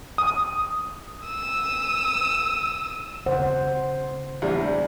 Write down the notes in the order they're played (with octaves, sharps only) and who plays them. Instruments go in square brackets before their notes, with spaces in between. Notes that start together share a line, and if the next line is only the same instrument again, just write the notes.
[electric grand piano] D#6
[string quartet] D#6 E6
[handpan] C#3 C5 F#5
[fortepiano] E2 G3 D4